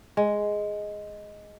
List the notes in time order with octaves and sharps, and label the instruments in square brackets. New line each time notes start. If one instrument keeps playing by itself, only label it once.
[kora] G#3